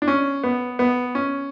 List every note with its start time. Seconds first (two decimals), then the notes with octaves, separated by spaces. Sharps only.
0.02 D4
0.08 C#4
0.44 B3
0.79 B3
1.15 C#4